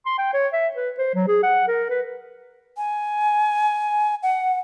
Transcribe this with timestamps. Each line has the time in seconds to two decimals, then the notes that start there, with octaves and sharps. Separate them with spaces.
0.06 C6
0.18 G5
0.33 C#5
0.53 E5
0.76 B4
0.98 C5
1.15 F#3
1.28 G#4
1.43 F#5
1.67 A#4
1.89 B4
2.77 G#5
4.23 F#5